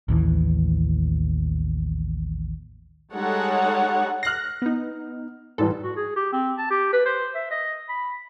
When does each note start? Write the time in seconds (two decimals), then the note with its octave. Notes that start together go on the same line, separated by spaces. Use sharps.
0.08 A1 D#2 E3
3.14 G3 G#3 D#4 A4 C#5 F#5
4.23 F6 F#6 A#6 C7
4.62 B3 D#4
5.58 G#2 E3 G3 A4
5.83 F#4
5.96 G#4
6.16 G4
6.33 C4
6.58 A5
6.70 G4
6.93 B4
7.05 C5
7.35 E5
7.51 D#5
7.89 B5